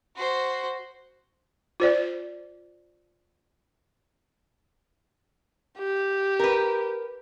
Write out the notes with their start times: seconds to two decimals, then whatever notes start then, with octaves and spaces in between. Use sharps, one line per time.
0.16 F#4 C5
1.80 F4 C5 D5
5.78 G4
6.40 A#4 B4